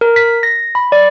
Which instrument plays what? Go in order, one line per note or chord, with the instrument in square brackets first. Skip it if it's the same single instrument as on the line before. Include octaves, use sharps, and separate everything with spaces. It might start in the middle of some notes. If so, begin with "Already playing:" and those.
[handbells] A#4
B6
A#6
B5
D5